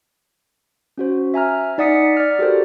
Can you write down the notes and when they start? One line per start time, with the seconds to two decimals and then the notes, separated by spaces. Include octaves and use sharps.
0.98 C#4 F#4 C5
1.34 E5 G#5 A#5 F6
1.78 D#4 D5 F#5 D#6 B6 C#7
2.17 D5 F6
2.39 F#4 G4 A4 A#4 C5